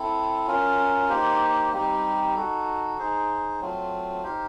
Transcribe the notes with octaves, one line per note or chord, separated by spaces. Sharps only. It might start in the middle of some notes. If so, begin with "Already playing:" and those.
Already playing: C4 E4 A4
C#4 F4 A#4
A#3 D#4 G4 C5
G3 C4 D#4 G4
D#4 F#4 A4
D#4 G#4 C5
F#3 A3 C4 F4
D#4 G4 C5 F5